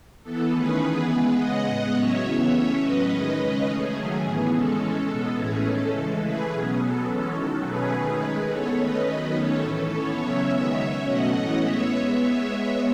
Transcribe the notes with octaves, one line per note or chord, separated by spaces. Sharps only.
E3 B3 A4
D#3 A3 C#4 G#4 B4
E3 B3
C#3 G#3 B3
C#3 G#3 B3 D#5 F#5
A2 G#3 B3
A2 F#3 C#4 C#5 E5
C#3 E3 B3
E3 A3 C#4
A2 F#3 C#4 B4 D#5
D#3 G#3 C#4
C#3 G#3 C#4
E3 A3 C#4 G#4
D#3 F#3 A3 C#4
A2 E3 B3
C#3 G#3 C#4 A4
E3 G#3 C#4 A4
B2 G#3 B3
A2 E3 A3 C#4 G#4
D#3 A3 C#4 A4
C#3 E3 G#3
C#3 E3 A3 G#4 B4
B2 F#3 C#4 G#4
B2 F#3 B3 A4
E3 G#3 C#4
D#3 F#3 C#4
B2 F#3 A3 C#4 G#4 B4
D#3 A3 C#4
D#3 G#3 C#4
E3 B3 A4 C#5
D#3 A3 C#4 B4 D#5
D#3 F#3 B3
D#3 A3 C#4 A4 C#5
A2 E3 A3 C#4 A4
E3 B3 A4 C#5
C#3 F#3 C#4 C#5 E5
D#3 G#3 B3
C#3 F#3 C#4
B2 F#3 A3 C#4 D#5 F#5
A2 E3 A3 C#4
A2 G#3 B3 C#5 E5